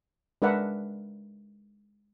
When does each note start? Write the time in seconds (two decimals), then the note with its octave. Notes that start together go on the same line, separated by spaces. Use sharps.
0.42 G#3 D4 A#4 B4 E5 F#5